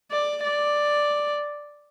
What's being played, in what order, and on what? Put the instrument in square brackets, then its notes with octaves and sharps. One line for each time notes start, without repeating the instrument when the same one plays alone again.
[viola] D5
D5